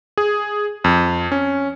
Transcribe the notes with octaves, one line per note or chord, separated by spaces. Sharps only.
G#4
F2
C#4